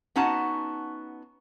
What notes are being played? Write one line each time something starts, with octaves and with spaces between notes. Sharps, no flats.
B3 C#4 D#4 F#4 F#5 A5